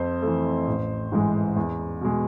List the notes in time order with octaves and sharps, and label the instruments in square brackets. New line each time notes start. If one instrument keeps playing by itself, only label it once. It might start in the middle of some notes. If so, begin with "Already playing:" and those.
Already playing: [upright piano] F2 C5
E3 A3
A1
G#2 E3 G#3
E2
B2 G#3